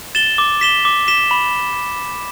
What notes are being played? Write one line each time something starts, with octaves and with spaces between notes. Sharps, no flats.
A6 E7 G7
D6
B6 E7 G7
D6
B6 E7 G7
B5